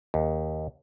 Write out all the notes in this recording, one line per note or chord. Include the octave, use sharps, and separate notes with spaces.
D#2